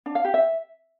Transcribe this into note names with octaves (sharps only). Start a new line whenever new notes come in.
D4
F5
G4
E5